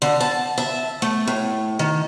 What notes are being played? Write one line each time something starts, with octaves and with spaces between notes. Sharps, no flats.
D3
A5
E5
A3
A2
D#3